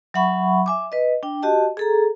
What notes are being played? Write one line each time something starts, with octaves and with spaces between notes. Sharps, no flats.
F#3 E5 F#5 B5 C#6
E5 G#5 D6
B4 D#5
D4 G5
F#4 G4 D#5 A5
G#4 A4 A#5